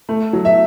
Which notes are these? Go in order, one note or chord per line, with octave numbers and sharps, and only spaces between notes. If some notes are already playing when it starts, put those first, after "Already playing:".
A3
F#3
E5